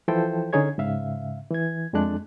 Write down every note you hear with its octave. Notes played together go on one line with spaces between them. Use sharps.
E3 F3 E4 A4 C5 G5
D3 C#4 D#4 G#4 C#5 G#6
G#2 C#3 E5 F5
E3 G#6
F2 G#3 A3 D4 F#6